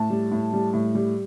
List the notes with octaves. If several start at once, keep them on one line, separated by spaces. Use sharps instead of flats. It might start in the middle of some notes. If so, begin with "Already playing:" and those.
Already playing: A2 A5
G3
A2
G3
A2
G3